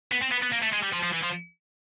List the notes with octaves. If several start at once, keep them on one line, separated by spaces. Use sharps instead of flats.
B3
C4
B3
B3
A#3
A3
G#3
G3
F3
F3
E3
F3